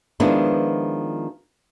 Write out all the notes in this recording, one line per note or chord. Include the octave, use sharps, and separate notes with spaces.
D#3 F3 G#3 B3 D4 E4